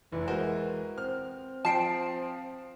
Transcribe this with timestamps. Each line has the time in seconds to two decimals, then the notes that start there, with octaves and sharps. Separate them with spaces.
0.12 F1 E3
0.28 G#3 F#4 A#4 C5
0.98 C4 F6
1.65 F3 G5 A5 C7 D7